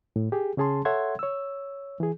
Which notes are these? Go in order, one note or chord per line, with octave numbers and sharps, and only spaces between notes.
A2
G4 G#4
C#3 C#4 G#4 A5 C6
A4 C#5 E5 F#5 C6 G#6
C#5 E6
E3 G#4